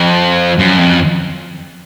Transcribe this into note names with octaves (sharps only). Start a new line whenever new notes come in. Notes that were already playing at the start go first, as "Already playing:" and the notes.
Already playing: F2
F#2
F2